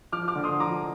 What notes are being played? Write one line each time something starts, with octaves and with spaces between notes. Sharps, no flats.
F3 D6 F6
D6 F6
D3
C6 D#6
F3 A#5 D6